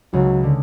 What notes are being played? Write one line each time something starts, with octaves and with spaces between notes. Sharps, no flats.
C#2 C#3 F#3
D3